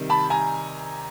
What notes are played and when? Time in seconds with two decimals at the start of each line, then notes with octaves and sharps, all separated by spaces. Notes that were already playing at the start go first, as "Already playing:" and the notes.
Already playing: C3 D#3 G3
0.10 A5 B5
0.30 G#5 A#5